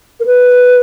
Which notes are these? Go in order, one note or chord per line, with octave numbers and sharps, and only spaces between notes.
A#4
B4